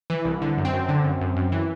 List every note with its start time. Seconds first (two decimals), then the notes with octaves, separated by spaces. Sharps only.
0.10 E3
0.25 C2
0.42 D3
0.58 F#2
0.65 C4
0.73 F#2
0.89 D3
1.04 F#2
1.21 F#2
1.37 F#2
1.52 E3